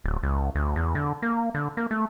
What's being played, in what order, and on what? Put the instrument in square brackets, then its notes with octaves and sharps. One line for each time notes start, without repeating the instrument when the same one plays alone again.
[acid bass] D1
C#2
D2
E2
D3
A#3
D3
A#3
A3